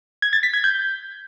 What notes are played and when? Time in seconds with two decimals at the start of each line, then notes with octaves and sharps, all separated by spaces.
0.22 G#6
0.33 A6
0.43 B6
0.54 G#6
0.64 G6